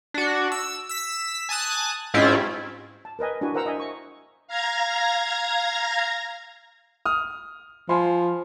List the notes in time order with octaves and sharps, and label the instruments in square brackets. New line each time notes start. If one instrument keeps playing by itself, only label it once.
[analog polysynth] D4 F#4
E6
E6 B6
G#5 A5 D#6 F#6
G#2 C4 C#4 E4 F4
[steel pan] A5
A#4 B4 D#5 G#5
D4 E4 F#4 G#5
A#4 C5 F#5 A#5 E6
D#5 E5 G#5
C#6
[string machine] F5 A#5 G#6 A#6
[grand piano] D#6 F6
[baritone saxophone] F3 [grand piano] G#5 B5 C6